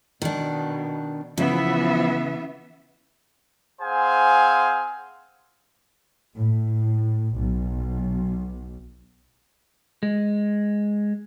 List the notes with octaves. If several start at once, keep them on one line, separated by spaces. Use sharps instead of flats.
B2 D#3 D4
C#3 E3 F3 B3 E5
C4 G#4 C5 F5 F#5 G#5
A2
B1
G#3